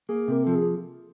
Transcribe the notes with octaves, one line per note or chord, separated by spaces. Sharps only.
A#3 G#4
C3 A#4
F3 A4
G#4